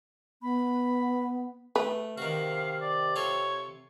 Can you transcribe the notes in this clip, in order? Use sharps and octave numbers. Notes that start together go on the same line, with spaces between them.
B3 B5
A3 B4
C3 D#3 F#4 F5
D5
F4 A4 C#5